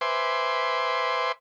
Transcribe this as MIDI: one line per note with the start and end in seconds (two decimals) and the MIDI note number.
0.01 1.32 71
0.01 1.32 72
0.01 1.32 76
0.01 1.32 80
0.01 1.32 84
0.01 1.32 86